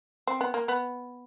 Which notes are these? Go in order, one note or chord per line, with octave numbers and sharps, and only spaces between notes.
C4
B3
A#3
B3